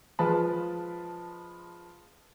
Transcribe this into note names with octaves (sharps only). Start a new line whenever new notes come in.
F3 G#3 F4 B4 A5 B5